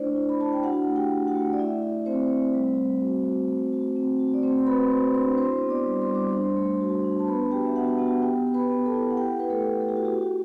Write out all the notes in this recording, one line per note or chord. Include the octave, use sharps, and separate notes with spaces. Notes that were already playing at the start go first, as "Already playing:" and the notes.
Already playing: A3 D4 E4 C5 D5
E4
B5
E4 A5
G5
D4 F#4 F#5
A3
G4 G5
F#4
F#4 F#5
A3
D5
E4 E5
E4
A3 C4 C5
A3
G3
G3
F#4
F#4
A3
F#4
C4
F#4
D5
A3 C4 C5
C6
F#4 B4 B5
F#4 C5 C6
D4 C5 C6
E4 C5 C6
B3
D5 D6
G3
C6
G3 D6
D4 C5 C6
A3
F#4
D4
A5
B3 B4 B5
F#4 G4 G5
E5
B3 F#4 F#5
B3 F#4 F#5
B3 G4 G5
B3
B4 B5
B3
A4 A5
E4
F#5
E4 G4 G5
E4 B4
A3 A4
E4
A4
E4 G4
F#4
G4
F#4